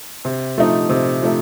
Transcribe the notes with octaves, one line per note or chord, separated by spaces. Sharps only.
C3
F3 A3 D#4
C3
F3 A3 D#4